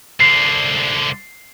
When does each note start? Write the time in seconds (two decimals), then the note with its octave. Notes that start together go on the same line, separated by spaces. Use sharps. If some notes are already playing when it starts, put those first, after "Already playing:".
0.20 C2 D3 C7